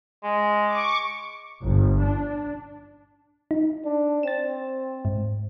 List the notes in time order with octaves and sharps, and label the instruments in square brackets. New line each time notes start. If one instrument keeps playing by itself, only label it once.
[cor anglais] G#3
[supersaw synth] C#6 D6
[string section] G1
D4
[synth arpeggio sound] D#4
[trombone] D4
[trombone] C4 [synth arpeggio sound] A6 E7
[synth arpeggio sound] G#2